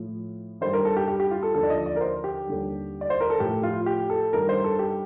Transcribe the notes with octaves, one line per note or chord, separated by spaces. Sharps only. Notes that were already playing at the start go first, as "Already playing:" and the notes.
Already playing: A2 F3
G2 D#3 G3 C5
A#4
A4
G4
G4
G4
F4
A4
D#2 D3 F3 A4
D5
D#5
D5
A#4
C5
G4
D#2 D3 G3
D5
C5
A#4
A4
A2 F3 G4
F4
G4
A4
G2 D#3 G3 A#4
C5
A4
G4